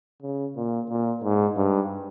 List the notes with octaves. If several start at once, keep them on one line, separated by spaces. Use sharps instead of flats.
C#3
A#2
A#2
G#2
G2